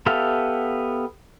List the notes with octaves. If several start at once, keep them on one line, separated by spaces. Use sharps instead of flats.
B3 G4 A4 E5 F5